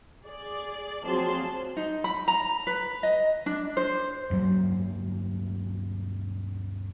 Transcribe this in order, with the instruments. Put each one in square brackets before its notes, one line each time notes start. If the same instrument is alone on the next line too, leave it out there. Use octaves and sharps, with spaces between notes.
[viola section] G#4 D5
F3 F#3 C4 G#4 A5 C6
[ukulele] D#4
B5
A#5
B4
D#5
D4
C5
[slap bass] D2 G2 F#3 A#3